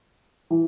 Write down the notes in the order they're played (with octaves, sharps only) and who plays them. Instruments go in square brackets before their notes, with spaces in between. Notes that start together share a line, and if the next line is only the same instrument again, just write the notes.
[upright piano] E3